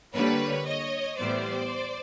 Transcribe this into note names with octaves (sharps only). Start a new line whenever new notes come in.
D3 G3 A#3 B4 C#5
C#5 D#5
A2 E3 G3 B3 C5 D5